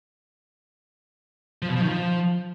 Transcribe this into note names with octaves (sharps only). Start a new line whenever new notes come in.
F3
B2
F3
D#3
F3